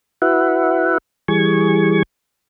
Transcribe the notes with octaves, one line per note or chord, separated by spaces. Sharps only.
E4 F#4 B4 E5 F#5
E3 G3 G#4 C#6 G#6